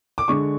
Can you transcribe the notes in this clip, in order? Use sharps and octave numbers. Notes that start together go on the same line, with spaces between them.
D6
D3 G#3 D4 C#6